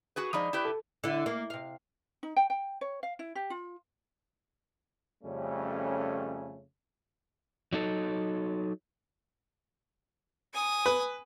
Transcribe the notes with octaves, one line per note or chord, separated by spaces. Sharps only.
F#4 G#4 B4
F3 G#3 D#4 D5 B5 D#6
E4 G4 B4
A4
D3 E4
A#3
C3 F5
D#4
G5
G5
C#5
F5
E4
G4
F4
F2 C#3 G3 A3 C#4
F#3 D#4 A4
G#5 D#6
B4